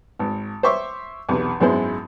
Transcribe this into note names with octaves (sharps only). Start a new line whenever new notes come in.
G#1
C5 C#5 E5 C#6 D6
B1 E2 C3
G#1 F#2 G#3 B3 E4 C5